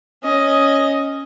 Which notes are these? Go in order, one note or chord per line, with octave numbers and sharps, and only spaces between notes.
C#4 D#5